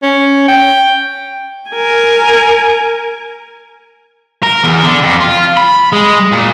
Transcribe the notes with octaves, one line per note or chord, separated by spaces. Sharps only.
C#4
G5
A#4 G#5
A#4
E2
D3
F2
F4
B5
G#3
A#2